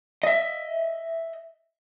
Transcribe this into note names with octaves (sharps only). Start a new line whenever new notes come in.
D#5 E5